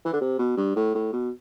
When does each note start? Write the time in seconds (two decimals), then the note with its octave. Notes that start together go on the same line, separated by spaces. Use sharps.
0.05 E3
0.13 D3
0.21 C3
0.39 B2
0.57 G2
0.76 A2
0.95 A2
1.13 B2